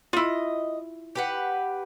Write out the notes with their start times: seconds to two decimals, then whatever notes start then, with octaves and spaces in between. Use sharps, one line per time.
0.13 E4 F4 D#5
1.15 G4 B4 F#5